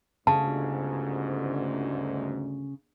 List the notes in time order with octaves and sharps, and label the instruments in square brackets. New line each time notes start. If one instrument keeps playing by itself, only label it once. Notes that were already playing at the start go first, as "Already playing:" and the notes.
[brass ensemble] G1 D2 G#2 [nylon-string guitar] C#3 [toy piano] A5